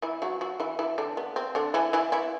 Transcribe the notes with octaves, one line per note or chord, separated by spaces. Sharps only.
E3 E4
F#3 F#4
F#3 F#4
E3 E4
E3 E4
D3 D4
B3
C4
D3 D4
E3 E4
E3 E4
E3 E4